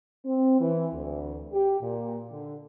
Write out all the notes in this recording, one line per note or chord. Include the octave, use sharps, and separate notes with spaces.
C4
E3
D2
G4
A#2
D3